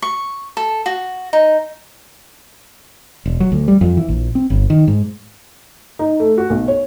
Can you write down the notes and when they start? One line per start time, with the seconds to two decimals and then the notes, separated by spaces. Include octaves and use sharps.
0.02 C#6
0.57 A4
0.86 F#4
1.33 D#4
3.26 E1
3.40 F#3
3.52 D2
3.68 G3
3.81 F2
3.97 E3
4.09 A#1
4.35 C4
4.50 G1
4.70 D#3
4.87 G#2
5.99 D#4
6.20 A3
6.38 F#4
6.50 B1
6.68 C#5